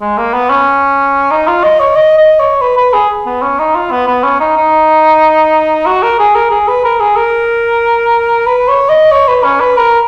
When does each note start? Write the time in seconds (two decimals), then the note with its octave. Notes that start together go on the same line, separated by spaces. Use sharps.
0.01 G#3
0.17 A#3
0.33 B3
0.49 C#4
1.31 D#4
1.47 F4
1.64 D#5
1.80 C#5
1.96 D#5
2.18 D#5
2.39 C#5
2.61 B4
2.77 B4
2.93 G#4
3.26 B3
3.42 C#4
3.59 D#4
3.75 F4
3.91 B3
4.07 B3
4.23 C#4
4.40 D#4
4.56 D#4
5.86 F#4
6.03 A#4
6.19 G#4
6.35 A#4
6.51 G#4
6.68 B4
6.84 A#4
7.00 G#4
7.16 A#4
8.46 B4
8.68 C#5
8.89 D#5
9.12 C#5
9.28 B4
9.44 C#4
9.60 B4
9.77 A#4